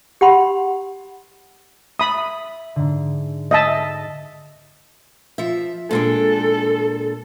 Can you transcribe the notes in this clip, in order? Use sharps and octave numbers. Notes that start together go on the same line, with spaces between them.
G4 F#5 B5 C6
E5 B5 D#6 A6
G#2 D3
D#5 E5 A5
F3 E5
A#2 G#3 D4 A4